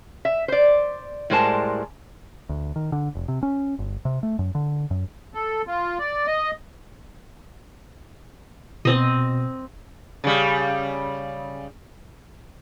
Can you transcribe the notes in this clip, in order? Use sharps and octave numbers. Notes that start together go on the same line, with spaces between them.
E5
C5 D5
A2 G3 G#3 A#4 C5 A5
D2
D#3
D3
F1
C3
C#4
G1
C3
A3
F#2
D3
F#2
A4
F4
D5
D#5
B2 C4 D#5
C#3 G3